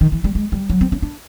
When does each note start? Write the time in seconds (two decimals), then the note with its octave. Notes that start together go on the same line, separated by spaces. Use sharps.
0.01 D#3
0.12 E3
0.24 G3
0.35 G#3
0.52 G3
0.70 F#3
0.81 C4
0.92 C#4
1.02 D4